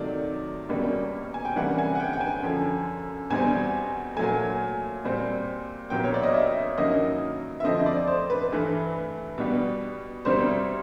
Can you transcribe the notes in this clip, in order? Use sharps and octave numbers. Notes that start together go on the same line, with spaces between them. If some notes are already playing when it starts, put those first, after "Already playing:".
Already playing: C3 D#3 F#3 A3 D5
C#2 B2 G3 A#3 C#4
G#5
G5
C3 E3 G3 A#3 C#4 F#5
G#5
F#5
G5
G5
G#5
F#2 D3 F3
E2 B2 G3 C4 G#5
A#2 F#3 A3 G#5
A#2 G3 C4
C2 A#2 F#3 B3 G5
C#5
D5
D#5
E5
G2 D#3 F#3 A#3 C#4 D#5
E5
F2 D3 F3 A3 C4 D#5
D5
C5
B4
G2 E3 A3
B2 G3 B3
C2 B2 G3 C4 C5